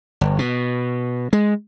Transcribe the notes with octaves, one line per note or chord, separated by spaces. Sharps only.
G1
B2
G#3